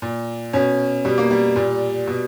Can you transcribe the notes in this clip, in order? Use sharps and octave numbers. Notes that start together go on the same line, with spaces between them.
A#2
B2 C#4
B2 G3
A#3
G3
A#2
B2